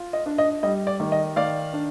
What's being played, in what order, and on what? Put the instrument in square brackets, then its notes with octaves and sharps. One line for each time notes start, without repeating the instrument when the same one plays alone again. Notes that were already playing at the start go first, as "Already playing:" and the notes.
Already playing: [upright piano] F4
D#5
D4
D#5
G3 D#5
D5
D#3
D#5
D#3 D5 F5
D4